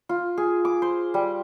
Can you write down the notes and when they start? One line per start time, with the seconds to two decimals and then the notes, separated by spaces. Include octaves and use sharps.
0.09 F4
0.38 G#4
0.65 D6
0.82 C5
1.14 G3